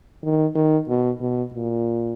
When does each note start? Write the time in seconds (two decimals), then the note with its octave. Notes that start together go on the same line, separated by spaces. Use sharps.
0.23 D#3
0.55 D#3
0.88 B2
1.21 B2
1.53 A#2